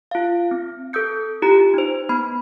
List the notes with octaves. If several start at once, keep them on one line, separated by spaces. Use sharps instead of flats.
F4 F5
C4
A4 D#6 E6 G6 C#7
E4 F4 G4 A#5
D#4 C5
B3 B5